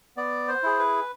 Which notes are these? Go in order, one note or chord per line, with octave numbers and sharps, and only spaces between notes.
B3 D5
C5
E4 G#4
B4